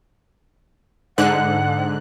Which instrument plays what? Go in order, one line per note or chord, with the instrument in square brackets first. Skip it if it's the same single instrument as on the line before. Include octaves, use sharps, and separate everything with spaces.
[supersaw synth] G#2 D3 F#6 [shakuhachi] F#5